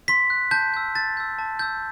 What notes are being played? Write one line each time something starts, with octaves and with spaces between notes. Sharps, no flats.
C6 B6
F#6
A5 G6
E6 G6
A5 A6
E6 G6
A5
E6 G6